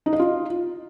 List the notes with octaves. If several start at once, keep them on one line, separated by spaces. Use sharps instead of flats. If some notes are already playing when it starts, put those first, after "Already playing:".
D#4
D#5
F4